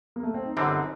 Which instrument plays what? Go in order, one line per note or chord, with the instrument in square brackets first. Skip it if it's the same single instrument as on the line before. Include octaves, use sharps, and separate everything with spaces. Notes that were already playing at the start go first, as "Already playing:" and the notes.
[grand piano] A#3
A3
C4
D#4
[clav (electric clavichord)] G1 F#2 D3 G3 C4 [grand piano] D#4